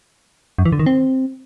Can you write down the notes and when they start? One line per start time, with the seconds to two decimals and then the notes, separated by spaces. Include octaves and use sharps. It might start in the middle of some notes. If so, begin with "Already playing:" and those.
0.58 F#2
0.65 E3
0.72 D3
0.79 D#3
0.86 C4